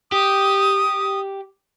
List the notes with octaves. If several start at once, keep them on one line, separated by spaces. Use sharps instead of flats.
G4 D#6